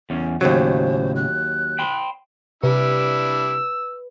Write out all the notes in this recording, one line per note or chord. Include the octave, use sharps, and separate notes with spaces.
E2 C#4
D#2 A2 C#3 F#3 C5
F#6
G5 B5 C6
C3 G3 D4 E4 B4 E6